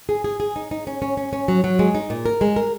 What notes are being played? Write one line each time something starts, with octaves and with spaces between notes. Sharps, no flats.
G#4
G#4
G#4
D#4
D#4
C#4
C#4
C#4
C#4
F#3
F#3
G#3
D#4
A#2
A#4
G#3
A#4